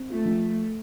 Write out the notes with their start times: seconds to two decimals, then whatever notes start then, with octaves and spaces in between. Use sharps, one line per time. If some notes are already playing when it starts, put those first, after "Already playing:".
Already playing: C4
0.09 A3 F4
0.26 F3